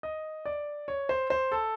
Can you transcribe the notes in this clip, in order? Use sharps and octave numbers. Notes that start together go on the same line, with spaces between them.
D#5
D5
C#5
C5
C5
A4